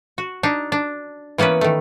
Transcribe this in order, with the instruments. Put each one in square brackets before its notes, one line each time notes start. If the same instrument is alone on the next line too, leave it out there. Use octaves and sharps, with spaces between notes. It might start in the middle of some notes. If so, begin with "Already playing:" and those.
[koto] F#4
D4 D#4
D4
E3 A#3 B3 C#4 B4
D#3 A3